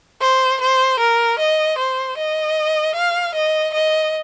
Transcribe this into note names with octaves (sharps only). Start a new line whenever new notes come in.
C5
C5
A#4
D#5
C5
D#5
F5
D#5
D#5